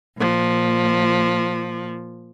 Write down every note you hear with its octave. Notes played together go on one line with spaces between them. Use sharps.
A#2 F3